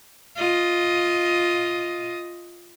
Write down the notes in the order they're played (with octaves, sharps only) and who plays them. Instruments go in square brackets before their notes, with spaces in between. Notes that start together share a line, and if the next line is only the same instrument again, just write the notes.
[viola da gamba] F4 D#5